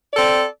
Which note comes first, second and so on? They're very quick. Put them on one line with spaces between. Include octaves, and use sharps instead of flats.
D5 A4 C4